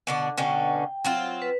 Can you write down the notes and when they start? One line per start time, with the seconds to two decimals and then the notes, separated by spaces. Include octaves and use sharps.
0.07 B2 D3 D5
0.38 B2 D3 C#4 G5
1.04 F#3 C4 F4
1.42 B4